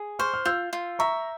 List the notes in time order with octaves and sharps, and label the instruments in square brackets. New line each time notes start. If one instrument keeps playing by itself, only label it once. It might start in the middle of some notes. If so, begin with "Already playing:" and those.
Already playing: [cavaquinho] G#4
[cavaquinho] C5 [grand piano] C#6 F6
[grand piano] F6
[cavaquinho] F4 [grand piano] E6 G6
[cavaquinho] F4
[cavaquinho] E5 [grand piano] A#5 C#6